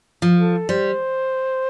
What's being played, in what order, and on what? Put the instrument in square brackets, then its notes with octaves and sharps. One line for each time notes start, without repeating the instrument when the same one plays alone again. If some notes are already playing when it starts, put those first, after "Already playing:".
[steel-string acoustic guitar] F3
[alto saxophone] A4
[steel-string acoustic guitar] G3 [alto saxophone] C5